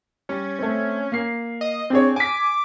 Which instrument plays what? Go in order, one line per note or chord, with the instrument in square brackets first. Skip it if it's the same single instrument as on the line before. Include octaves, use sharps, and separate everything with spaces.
[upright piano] G3 [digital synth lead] C#4
[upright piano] A3 C4
A#3 C7
[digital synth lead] D#5
[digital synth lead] C4 [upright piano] D4 G#4 C#5
[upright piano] G#5 B6 [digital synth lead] D6